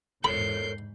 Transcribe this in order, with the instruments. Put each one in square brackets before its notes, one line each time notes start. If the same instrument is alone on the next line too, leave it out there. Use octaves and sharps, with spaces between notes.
[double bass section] E2 G#2 [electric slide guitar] A4 A#4 C#5 [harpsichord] B5 [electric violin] G6 C7